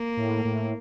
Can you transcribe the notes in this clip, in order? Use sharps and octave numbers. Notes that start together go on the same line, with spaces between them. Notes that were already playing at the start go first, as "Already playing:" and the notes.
Already playing: A#3
A2
A2